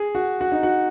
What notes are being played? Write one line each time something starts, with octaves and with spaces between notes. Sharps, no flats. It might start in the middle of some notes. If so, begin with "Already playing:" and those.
Already playing: G#4
F#4
F#4
D#4
F#4